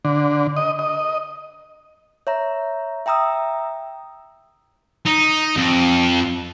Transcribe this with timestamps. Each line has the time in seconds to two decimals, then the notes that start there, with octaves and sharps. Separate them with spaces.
0.05 D3
0.56 D#5
0.79 D#5
2.27 C#5 E5 A#5
3.06 E5 G5 A#5 D#6 E6
5.06 D#4
5.57 F2